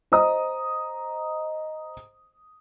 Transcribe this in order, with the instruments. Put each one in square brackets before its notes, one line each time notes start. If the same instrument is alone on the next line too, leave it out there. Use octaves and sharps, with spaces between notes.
[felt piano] C5 D#5 A#5 D#6